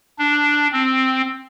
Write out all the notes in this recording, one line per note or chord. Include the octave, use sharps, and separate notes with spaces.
D4
C4